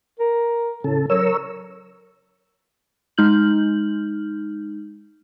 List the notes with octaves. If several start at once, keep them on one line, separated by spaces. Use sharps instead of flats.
A#4
A2 C#3 A4
F#3 A#4 C#5 E6
G#3 D#4 F6 G6 F#7